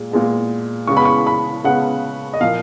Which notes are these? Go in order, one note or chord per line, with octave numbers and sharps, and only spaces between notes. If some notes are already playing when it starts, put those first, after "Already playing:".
Already playing: A#2 G#3
A#2 G#3 B3
C#3 G#3 B3 C#6
B5
C#6
B5
C#3 G#3 B3 F#5
D#5
A#2 F3 A#3 F5